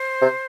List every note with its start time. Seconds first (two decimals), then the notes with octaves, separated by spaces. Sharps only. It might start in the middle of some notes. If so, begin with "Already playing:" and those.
Already playing: C5
0.22 C3